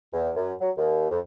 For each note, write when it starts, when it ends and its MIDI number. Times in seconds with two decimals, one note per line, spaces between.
0.13 0.30 40
0.36 0.53 42
0.60 0.70 54
0.77 1.07 39
1.10 1.19 41